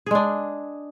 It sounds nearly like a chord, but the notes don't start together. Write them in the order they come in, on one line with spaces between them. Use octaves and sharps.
G#4 G#3 D4